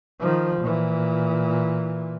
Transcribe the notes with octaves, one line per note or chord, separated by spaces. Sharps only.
D#3 F3
A#2 E3